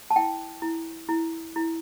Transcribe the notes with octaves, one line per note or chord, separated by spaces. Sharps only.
A5
E4 G5
E4
E4
E4